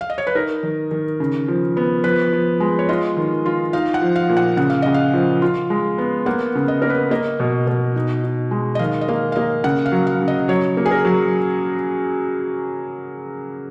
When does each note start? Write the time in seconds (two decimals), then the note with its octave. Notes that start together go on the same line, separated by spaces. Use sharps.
0.01 F5
0.10 D#5
0.18 C#5
0.27 B4
0.35 D#4 A#4
0.63 D#3
0.91 D#3
1.20 C#3
1.48 F3
1.77 B3
2.04 F3 B4
2.32 F3
2.60 G#3
2.79 C#5
2.89 F4 D#5
3.17 D#3
3.46 F4
3.73 D#4 F5
3.94 F#5
4.02 F3
4.16 F5
4.29 A#2
4.37 F#5
4.57 C#3 F#5
4.70 F5
4.82 C#3 D#5
4.94 F5
5.13 F3
5.42 F4
5.70 G#3
5.98 B3
6.26 A#3 F#5
6.55 C#3
6.68 D#5
6.82 A#3 A#4
6.90 B4
7.11 A#3 D#5
7.40 B2
7.67 B2
7.96 D#4
8.23 D#4
8.51 G#3
8.75 D#5
8.79 D#3 F5
9.01 D#5
9.08 A#3 F5
9.32 F5
9.36 A#3 D#5
9.64 C#3 F#5
9.86 F5
9.92 F#3
10.07 F5
10.21 C#3
10.28 D#5
10.48 F#3 C#5
10.77 A#3
10.86 G#4
10.91 A#4
11.05 F#3